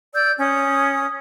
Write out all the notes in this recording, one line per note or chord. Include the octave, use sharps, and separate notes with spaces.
D5 E6 G6
C#4 D#6